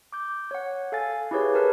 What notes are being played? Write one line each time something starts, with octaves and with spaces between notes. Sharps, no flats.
D6 G6
C#5 F#5
A4 F5 G#5 A6
E4 G4 G#4 B4 C#5
A#4 B4 A5